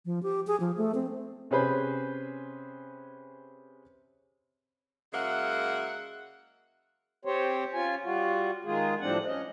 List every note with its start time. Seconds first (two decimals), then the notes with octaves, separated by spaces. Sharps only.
0.05 F3
0.23 G4
0.47 G#4
0.60 F3
0.78 A3
0.95 C4
1.51 C3 C#4 G#4 B4 C5 B5
5.13 C#3 F#3 G#3 A#3 E5 F#5
7.25 C4 G4 C5 C#5
7.74 C#4 F4 G#5
8.04 G3 F4 F#4
8.65 D#3 G#3 F4 G#4
9.01 A2 F3 G3 C4 D4 F#5
9.26 C#4 D#5